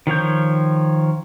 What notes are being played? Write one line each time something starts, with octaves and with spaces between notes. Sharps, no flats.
D#3 F3 C#5 G6